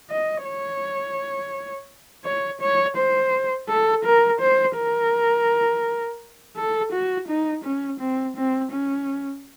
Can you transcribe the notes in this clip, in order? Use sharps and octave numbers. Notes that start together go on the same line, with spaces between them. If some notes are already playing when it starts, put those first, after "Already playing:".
D#5
C#5
C#5
C#5
C5
A4
A#4
C5
A#4
A4
F#4
D#4
C#4
C4
C4
C#4